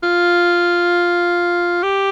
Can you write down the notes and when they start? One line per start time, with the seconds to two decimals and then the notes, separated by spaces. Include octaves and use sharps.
0.03 F4
1.83 G4